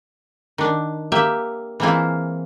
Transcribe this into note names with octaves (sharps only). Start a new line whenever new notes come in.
D#3 D4
A#3 G4 E5
E3 G#3 A#3 C4 E4 F4